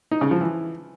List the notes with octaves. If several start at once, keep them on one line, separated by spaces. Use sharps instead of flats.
D#4
C#3
F3
E3